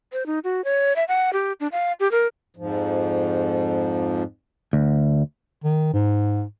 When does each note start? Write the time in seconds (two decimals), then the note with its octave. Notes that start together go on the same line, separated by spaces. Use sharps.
0.13 C5
0.26 D#4
0.44 F#4
0.64 C#5
0.96 E5
1.08 F#5
1.33 G4
1.60 D4
1.72 F5
2.00 G4
2.12 A#4
2.57 F2 G#2 F3
4.73 D2
5.64 D#3
5.93 G#2